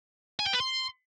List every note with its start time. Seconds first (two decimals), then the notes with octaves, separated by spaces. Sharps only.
0.39 G#5
0.46 G5
0.53 B4
0.60 C6